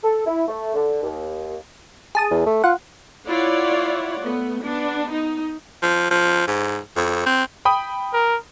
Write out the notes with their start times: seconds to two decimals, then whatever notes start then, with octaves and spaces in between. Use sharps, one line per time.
0.04 A4
0.27 E4
0.48 A3
0.75 D3
1.03 D#2
2.15 G#4 A5 D#6
2.31 E2
2.46 A3
2.64 F4 F#5
3.27 E4 F4 C#5 D5 F#5
4.20 A3 B3
4.63 B3 D4
5.11 D#4
5.82 F3
6.11 F3
6.48 G#2
6.96 F2
7.26 C4
7.65 G5 B5 D#6
8.13 A#4